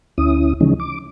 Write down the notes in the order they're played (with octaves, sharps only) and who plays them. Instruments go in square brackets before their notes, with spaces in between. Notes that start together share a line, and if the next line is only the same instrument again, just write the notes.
[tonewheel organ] D2 C#4 E4 D#6
C#3 E3 F3 G#3 C#4 D#4
D6